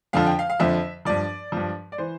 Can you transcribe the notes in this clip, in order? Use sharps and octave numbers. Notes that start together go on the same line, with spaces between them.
F2 D3 F3 F5
G5
F5
F5
F2 D3 F3 E5
G2 F3 D5
G2 F3
D5
E3 C5